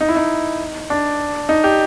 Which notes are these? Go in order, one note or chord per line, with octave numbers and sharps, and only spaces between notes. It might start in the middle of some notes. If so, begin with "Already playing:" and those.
D#4
E4
D#4
D4
D#4
G4